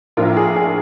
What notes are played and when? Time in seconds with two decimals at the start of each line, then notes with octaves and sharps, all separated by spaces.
0.17 A2 F3 A#3 D4 F4 A#4
0.37 G#4
0.56 G#4